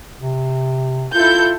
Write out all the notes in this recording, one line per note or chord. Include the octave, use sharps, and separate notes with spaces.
C3
E4 F4 A4 G6